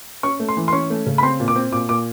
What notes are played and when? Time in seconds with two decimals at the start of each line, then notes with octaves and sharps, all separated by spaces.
0.23 C#4 C#6
0.40 A3
0.49 C6
0.57 E3
0.68 C6
0.73 C#4 C#6
0.90 A3
1.06 C#3
1.18 B5
1.23 C4 C6
1.40 A#2
1.48 D6
1.56 C4
1.72 A#2 D6
1.89 A#2 D6